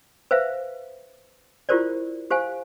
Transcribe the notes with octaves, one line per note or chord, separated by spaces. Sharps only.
B4 C5 E5 F5
E4 F4 G4 A#4 C5 D5
G4 C5 F5 G#5